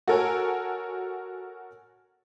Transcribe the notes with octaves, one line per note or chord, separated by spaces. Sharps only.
F#4 A4 A#4 C#5 G#5